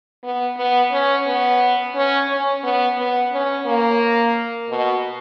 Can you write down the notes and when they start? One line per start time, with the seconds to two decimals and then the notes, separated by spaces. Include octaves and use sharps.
0.23 B3
0.57 B3
0.92 C#4
1.26 B3
1.95 C#4
2.29 C#4
2.64 B3
2.98 B3
3.32 C#4
3.66 A#3
4.70 B2